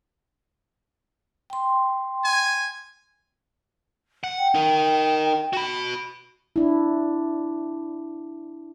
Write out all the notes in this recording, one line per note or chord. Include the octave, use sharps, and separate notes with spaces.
G5 C6
G#5
F#5
G5
D#4 A#4
F#4 B5
D4 E4